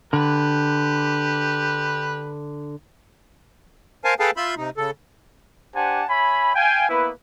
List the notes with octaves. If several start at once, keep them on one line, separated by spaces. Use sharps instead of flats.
D3 G4 B4
A#4 C5 F5 G#5 A5
G#4 A4 B4 F5 G5 A5
F4 E5 B5 C6 G6
C3 D#4
C#3 A4
D4 G4 C5 F#5 G#5 A5
C#5 E5 G#5 B5
F5 G5 G#5
A#3 B3 E4 B4